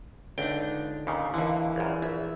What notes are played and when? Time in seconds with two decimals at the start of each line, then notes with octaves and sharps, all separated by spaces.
0.38 C#2 D3 D4 D#4 G5
1.07 D#2 A#2 C#3
1.34 D#2 D3 E3 A#3
1.76 A#1 F#2
2.02 A#1 E5